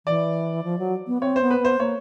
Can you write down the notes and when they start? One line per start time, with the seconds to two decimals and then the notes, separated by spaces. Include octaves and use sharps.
0.06 E3 D5
0.64 F3
0.79 F#3
1.07 B3
1.21 C4 C#5
1.36 C5
1.41 B3
1.51 B4
1.60 B3 C5
1.79 A#3 C#5